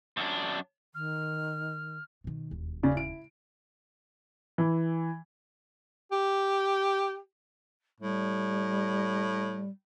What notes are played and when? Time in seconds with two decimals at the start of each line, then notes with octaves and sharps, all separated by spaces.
0.17 F#2 D4
0.95 D#3 F6
2.24 B2 D#3
2.51 E1 D#2
2.83 C#3 D5
2.95 E4 D7
4.58 E3
6.12 G4
8.00 A2 G3